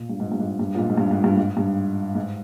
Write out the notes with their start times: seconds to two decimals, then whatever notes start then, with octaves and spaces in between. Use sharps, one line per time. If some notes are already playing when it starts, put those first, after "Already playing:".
Already playing: A#2
0.09 G2
0.20 G#2
0.32 G2
0.39 G#2
0.59 G2
0.75 A#2
0.79 G#2
0.90 G#2
0.98 G2
1.11 G#2
1.24 G2
1.37 G#2
1.57 G2
2.15 G#2